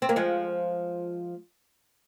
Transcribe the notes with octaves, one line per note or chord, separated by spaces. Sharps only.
C4
A#3
F3 G#3